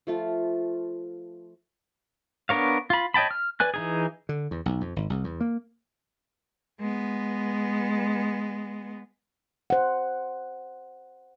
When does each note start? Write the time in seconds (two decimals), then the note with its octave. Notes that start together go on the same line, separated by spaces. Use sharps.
0.07 F3 A3 F4
2.49 B3 D4 A#4 C#5 F5
2.90 F4 B5
3.14 C#5 D#5 G5 A5 B5
3.31 F6
3.60 B4 D5 G#5 F#6
3.74 E3 D#4 G#4
4.29 D3
4.51 E2
4.66 B1
4.81 F2
4.96 G#1
5.10 C2
5.24 E2
5.41 A#3
6.80 G#3 B3
9.70 C5 F#5